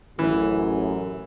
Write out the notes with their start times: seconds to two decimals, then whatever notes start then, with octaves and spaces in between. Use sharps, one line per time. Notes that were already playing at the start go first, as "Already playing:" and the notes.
0.19 A1 F#2 E3